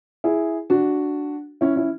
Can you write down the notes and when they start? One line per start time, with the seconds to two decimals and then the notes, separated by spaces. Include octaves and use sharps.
0.24 E4 G#4
0.70 D4 F#4
1.61 C#4 E4
1.76 C#4 E4